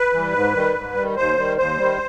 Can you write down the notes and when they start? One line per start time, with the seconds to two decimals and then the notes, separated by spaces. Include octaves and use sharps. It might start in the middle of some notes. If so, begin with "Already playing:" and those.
Already playing: B4
0.13 E3 G3
0.33 G#2
0.55 D#3 G3
0.75 G#2
0.95 D#3 G3
1.16 D#2 C5
1.37 D#3 G3
1.57 D#2 C5
1.78 D#3 G3